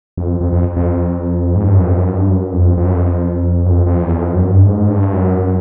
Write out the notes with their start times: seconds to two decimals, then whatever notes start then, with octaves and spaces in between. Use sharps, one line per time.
0.17 F2
0.40 F2
0.52 F2
0.77 F2
1.56 G#2
1.64 G2
1.74 F#2
1.83 F2
1.98 F#2
2.14 G2
2.30 F#2
2.53 F2
2.77 F2
2.85 F#2
2.94 F2
3.66 F#2
3.71 F2
3.87 F2
4.02 E2
4.19 F2
4.35 F#2
4.50 G2
4.65 G#2
4.90 G2
5.13 F#2